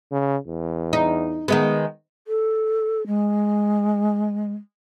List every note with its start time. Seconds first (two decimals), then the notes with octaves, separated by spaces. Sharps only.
0.12 C#3
0.47 E2
0.93 D#4
1.48 D#3 G#3 B3
2.27 A4
3.07 G#3